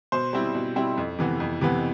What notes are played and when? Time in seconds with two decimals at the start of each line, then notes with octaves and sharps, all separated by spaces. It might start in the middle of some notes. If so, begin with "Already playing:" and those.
0.12 B2 C5
0.33 G3 C4 E4
0.55 B2
0.76 G3 C4 E4
0.97 F2
1.19 C3 E3 B3
1.40 F2
1.61 C3 E3 B3